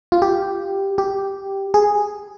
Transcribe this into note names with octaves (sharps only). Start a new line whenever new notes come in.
F4
G4
G4
G#4